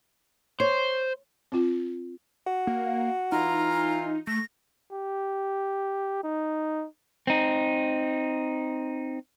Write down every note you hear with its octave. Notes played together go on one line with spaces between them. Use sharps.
C5 C#5
C4 F4
F#4
A#3
E3 D#4 F4 A#5
A3 A#6
G4
D#4
C4 D#4